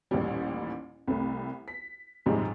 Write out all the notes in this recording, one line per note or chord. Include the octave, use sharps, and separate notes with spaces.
A1 D#2 A#2 G3
C2 C3 A3
B6
A#1 D#2 G#2 C3 G3 G#3